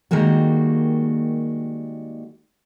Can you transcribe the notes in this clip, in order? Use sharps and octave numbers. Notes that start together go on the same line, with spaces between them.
D#3 G3 G#3 A#3 F#4